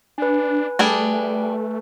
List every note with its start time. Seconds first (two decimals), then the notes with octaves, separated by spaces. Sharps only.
0.18 D4 B4 G#5
0.79 G3 A3 D4 G#4